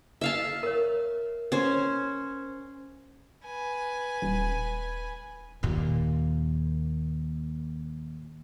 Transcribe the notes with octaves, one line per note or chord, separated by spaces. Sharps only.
E5 F5 A5
A#4 C#5
C#4 C5
B4 G#5
D#1
D#2 A#2